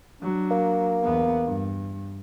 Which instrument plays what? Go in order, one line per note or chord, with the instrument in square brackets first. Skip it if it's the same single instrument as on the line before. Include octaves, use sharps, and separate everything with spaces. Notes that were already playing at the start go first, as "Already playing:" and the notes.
[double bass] F#3 D4
[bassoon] A#3
[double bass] E2 B3
G2